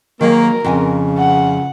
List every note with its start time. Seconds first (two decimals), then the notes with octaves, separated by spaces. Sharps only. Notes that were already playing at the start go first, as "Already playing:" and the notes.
0.21 D#3 F#3 A#3 G#4 A#4
0.65 F2 C#3 G5 G#5
1.18 F#5